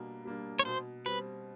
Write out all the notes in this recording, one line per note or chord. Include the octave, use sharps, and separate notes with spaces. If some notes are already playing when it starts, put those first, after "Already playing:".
Already playing: B2 G3 A#3 D4
G3 A#3 D4
C#5
B2 C5
G3 C4 B4